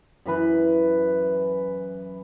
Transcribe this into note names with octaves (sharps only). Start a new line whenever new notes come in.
F#2 E3 B4